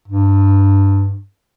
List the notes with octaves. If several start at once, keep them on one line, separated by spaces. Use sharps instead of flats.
G2